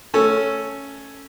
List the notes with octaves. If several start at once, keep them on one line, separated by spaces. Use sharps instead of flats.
A3 C#4 A4